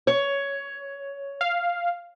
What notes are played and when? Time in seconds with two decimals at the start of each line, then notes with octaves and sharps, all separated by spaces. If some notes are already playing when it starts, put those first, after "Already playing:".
0.07 C#5
1.41 F5